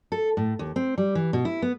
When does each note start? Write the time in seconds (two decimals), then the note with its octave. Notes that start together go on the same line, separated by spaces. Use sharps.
0.12 A4
0.37 A2
0.59 D#2
0.76 C4
0.98 G3
1.15 E3
1.33 B2
1.45 E4
1.62 B3